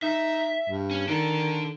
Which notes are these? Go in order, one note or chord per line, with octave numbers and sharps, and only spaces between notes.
D#4 E5
G2
C#4
D#3 D4 A4